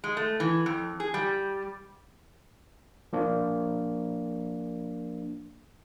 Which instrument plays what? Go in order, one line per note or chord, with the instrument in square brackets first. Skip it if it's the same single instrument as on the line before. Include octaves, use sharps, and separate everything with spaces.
[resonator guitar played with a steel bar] G#3
A3
E3
F2
G#4
G3
[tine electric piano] F3 A#3 D4